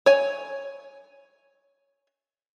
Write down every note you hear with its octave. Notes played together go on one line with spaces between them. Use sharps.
C#5 G#5